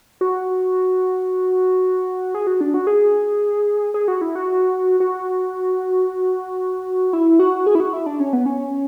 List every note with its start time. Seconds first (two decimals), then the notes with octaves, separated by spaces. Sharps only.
0.21 F#4
2.35 G#4
2.47 F#4
2.61 D4
2.74 F#4
2.87 G#4
3.94 G#4
4.08 F#4
4.21 E4
4.35 F#4
5.00 F#4
7.13 E4
7.39 F#4
7.66 G#4
7.75 E4
7.80 F#4
7.93 E4
8.06 D4
8.20 C#4
8.33 B3
8.46 C#4